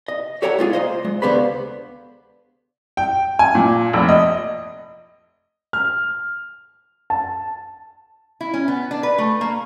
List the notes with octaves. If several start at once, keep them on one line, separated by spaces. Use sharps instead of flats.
D#5
G4 A4 C#5 F#5 G5 A#5
G#3 F4 G4 G#4
A#3 C5 D#5
G#3
C#2 D3 B3 G4 C5 B5
G5
G#5
A#2
F1
D#5
F6
A5
E4
C#4
B3
D4
B4
A3
A#3